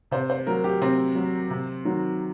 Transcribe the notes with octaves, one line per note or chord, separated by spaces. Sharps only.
C3 C5
C5
F#3 A#4
G4
C3 C4
F#3
C3
D#3 F#3